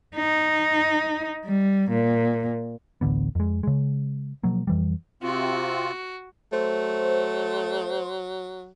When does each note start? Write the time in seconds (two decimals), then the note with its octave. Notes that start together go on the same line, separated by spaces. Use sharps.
0.17 D#4
1.45 G3
1.90 A#2
3.01 D1 A1 D3 B3
3.35 F2 G#3
3.63 C#3 G#3
4.43 B2 F3 F#3 A#3
4.67 F2 E3 G3
5.23 C3 C4 F4 F#4
6.53 F#3 A3 C5